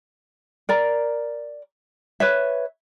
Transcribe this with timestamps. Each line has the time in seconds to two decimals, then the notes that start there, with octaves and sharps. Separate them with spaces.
0.69 A#4 D5 A#5
2.20 B4 C#5 E5